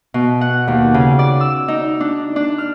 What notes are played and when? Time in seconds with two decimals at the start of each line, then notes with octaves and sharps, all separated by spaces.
0.14 B2
0.41 F#5
0.68 D#2
0.94 C#3
1.19 D5
1.41 E6
1.68 D#4
2.00 D4
2.36 D4
2.58 F6